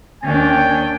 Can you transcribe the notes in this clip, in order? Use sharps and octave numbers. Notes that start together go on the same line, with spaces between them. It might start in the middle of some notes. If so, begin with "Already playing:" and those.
D#2 C#4 D4 G5